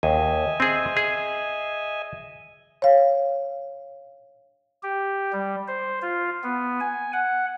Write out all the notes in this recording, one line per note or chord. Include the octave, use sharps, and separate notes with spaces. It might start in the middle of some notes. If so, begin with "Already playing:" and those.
D#2 D#5 E5 G#5
C4 G#4
G#4
C#5 F5
G4
G3
C5
F4
B3
G#5
F#5